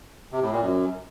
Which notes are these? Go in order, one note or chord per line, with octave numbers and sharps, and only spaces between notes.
C3
A2
A#2
F#2